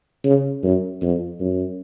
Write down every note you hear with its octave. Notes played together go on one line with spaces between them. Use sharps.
C#3
F#2
F2
F#2